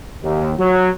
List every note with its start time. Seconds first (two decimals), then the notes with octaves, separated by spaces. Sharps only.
0.24 D#2
0.58 F#3